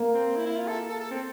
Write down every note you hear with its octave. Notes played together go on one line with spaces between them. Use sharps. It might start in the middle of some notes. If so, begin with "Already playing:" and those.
Already playing: A#3
C4
E4
E4
F4
A4
A4
A4
C4